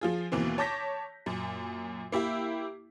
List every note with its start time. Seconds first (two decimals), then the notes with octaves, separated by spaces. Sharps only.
0.01 F3 F4 G#4
0.32 D#2 B2 E3 A#3 C4
0.58 C#5 A5 D6 G6 A#6 B6
1.26 F#2 A#2
2.12 A#3 E4 G4 E5